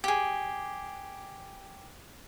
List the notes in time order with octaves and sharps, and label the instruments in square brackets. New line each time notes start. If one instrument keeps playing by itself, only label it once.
[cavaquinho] G4 G#4